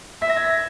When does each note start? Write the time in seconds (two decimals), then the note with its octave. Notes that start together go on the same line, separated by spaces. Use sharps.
0.22 E5 B6
0.30 A#6
0.37 G#6
0.44 A#6